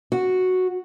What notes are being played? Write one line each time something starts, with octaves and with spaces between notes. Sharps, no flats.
F#4